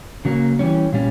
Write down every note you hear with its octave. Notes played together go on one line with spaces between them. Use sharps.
C#3 F#3 A#3
E3 G3 C#4
A#2 G3 C#4